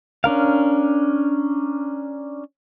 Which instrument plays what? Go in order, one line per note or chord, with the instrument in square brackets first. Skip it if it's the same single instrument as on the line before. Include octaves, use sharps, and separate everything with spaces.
[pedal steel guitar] C#4 D4 A#4 F5